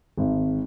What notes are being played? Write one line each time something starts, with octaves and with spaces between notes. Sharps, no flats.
G#1